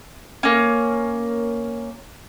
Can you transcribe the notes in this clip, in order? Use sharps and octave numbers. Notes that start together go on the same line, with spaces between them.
A#3 C#4